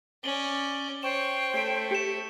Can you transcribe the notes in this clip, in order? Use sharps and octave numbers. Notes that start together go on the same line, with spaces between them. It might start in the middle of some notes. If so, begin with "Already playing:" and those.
C#4 D5 F#7 G7
C5 C#5 G5 C#6 E7
A3 C#5 E5
G4 C#7 E7